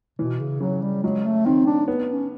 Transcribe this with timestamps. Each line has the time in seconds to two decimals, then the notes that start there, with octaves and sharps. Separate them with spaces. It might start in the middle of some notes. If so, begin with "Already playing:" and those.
0.19 B2 E3
0.40 C#3
0.60 C#3 F#3
0.82 G3
1.03 F#3 G#3
1.25 A3
1.46 D#3 C4
1.67 D4
1.88 B3
2.09 C#4